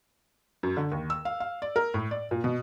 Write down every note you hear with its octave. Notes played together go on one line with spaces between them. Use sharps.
F#2
D3
D#2
E6
F5
F5
D5
A#4
A2
D5
A#2
B2